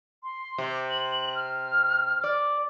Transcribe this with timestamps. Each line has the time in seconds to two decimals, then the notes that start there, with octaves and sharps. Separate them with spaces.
0.23 C6
0.58 C3
0.90 F#7
1.35 F6
2.24 D5